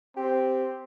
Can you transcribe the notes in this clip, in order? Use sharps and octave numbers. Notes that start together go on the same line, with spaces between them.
C4 G4